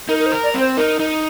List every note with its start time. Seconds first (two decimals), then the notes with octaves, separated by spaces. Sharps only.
0.09 D#4 A#4
0.20 A#4
0.26 C5
0.32 A#4
0.44 D5
0.54 C4
0.60 C5
0.77 D#4 A#4
1.00 D#4